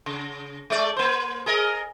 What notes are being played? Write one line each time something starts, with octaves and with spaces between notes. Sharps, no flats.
C#3
G#3 A3 D5
A#3 C5
G#4 A#4 D#5